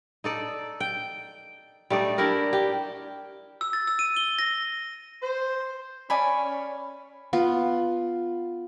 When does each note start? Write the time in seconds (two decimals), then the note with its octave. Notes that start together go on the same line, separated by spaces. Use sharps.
0.24 D#4 A4 D5
0.80 G5
1.90 G3 A3 D#4 D5
2.18 D4 E4 G4 A#4
2.53 G4
3.61 E6
3.73 A6
3.87 E6
3.99 D#7
4.17 G7
4.39 A#6
5.22 C5
6.10 C#4 D5 G#5 B5
7.33 B3 F4